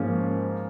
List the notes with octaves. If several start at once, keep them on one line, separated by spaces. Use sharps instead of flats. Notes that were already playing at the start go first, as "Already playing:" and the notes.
Already playing: G#2 F3 A#3 C#4